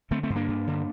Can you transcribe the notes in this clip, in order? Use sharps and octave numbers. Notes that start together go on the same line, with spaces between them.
D3 A3 C4
A3 C4
G2
A#3 D4
G2
D3